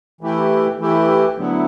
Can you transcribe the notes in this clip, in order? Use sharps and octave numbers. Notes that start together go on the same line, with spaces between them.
E3 A3 E4 G4
E3 A3 E4 G4
D2 D3 F#3 B3 E4